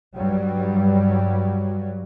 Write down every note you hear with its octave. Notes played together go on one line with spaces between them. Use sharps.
G2 F#3 G3